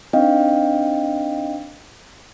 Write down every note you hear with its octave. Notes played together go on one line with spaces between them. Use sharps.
C4 D4 D#4 D#5 F5 G5